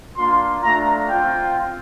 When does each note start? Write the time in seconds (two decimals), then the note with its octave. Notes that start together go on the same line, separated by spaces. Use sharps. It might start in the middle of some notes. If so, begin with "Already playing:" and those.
0.17 A#3 D4 F4 C6
0.63 A3 D4 F4 A#5
1.10 C4 F4 G5